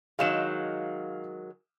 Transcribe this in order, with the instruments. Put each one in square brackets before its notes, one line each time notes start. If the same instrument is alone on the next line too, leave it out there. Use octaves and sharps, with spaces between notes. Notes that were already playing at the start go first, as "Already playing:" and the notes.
[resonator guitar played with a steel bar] D#3 F#3 G#3 [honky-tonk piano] F5 E7